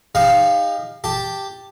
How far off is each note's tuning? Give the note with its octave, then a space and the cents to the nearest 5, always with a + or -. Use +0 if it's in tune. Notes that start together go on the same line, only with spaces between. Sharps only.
D#4 +0 G4 +45 F5 +0
G4 +0 A5 +0